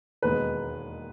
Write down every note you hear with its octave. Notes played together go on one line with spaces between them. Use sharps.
E1 D#2 D#3 G#3 B3 B4